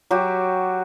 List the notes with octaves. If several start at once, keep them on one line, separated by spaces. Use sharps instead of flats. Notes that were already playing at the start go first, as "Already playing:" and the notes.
F#3 F#4 G4